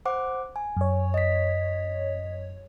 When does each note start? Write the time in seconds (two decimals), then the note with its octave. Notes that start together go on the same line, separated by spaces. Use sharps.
0.05 C5 F#5 D6
0.56 G#5
0.77 F#2 C#5
1.14 D#5 B6